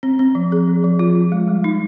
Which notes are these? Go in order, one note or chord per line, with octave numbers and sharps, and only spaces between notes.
C4
C4
F3
G#4
F3
F3
F4
F3
G#3
G3
D#4